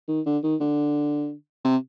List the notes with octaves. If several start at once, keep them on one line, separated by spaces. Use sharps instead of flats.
D#3
D3
D#3
D3
C3